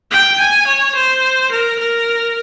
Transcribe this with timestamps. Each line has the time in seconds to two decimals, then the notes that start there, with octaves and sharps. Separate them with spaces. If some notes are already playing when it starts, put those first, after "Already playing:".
0.11 G5
0.39 G#5
0.67 C#5
0.95 C5
1.51 A#4
1.79 A#4